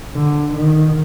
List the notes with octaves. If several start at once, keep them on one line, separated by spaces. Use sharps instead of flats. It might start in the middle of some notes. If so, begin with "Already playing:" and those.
D3
D#3